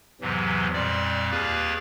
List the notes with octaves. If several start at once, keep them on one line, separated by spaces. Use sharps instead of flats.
E2 G#2 C3 E3 F#3
F2 A#2 G3 D5
D#2 A#3 G4 G#4 B4 A6